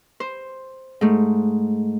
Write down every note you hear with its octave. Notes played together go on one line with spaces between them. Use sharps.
C5
G#2 A3